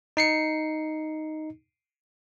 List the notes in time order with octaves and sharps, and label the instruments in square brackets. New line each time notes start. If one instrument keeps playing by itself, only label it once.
[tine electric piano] D#4 C7 C#7